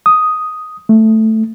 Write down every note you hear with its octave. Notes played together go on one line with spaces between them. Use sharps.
D#6
A3